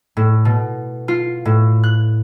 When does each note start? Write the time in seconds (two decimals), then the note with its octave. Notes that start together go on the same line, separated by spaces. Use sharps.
0.17 A2
0.45 B2
1.08 F4
1.45 A2
1.83 F#6